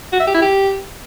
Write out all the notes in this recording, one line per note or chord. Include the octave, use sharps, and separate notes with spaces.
F#4
E5
G4
E4
G4